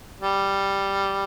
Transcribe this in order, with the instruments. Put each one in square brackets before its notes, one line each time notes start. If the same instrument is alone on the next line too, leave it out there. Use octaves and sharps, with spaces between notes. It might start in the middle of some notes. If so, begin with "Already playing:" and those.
[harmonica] G3